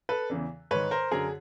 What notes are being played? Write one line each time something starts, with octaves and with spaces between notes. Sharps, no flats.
A4 B4
E2 C#3 E3
G#2 D#3 B4 C#5
A#4 C5
F#2 D3 G#4 A#4